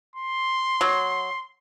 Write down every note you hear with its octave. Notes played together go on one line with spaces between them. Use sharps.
C6
F#3